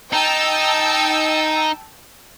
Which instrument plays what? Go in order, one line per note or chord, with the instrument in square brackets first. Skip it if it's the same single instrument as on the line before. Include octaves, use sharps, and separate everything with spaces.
[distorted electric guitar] D#4 [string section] G5 A5 E6